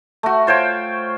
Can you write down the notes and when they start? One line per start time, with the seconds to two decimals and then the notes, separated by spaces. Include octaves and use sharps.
0.23 A3 F#4
0.47 F4 C5 C#5 G5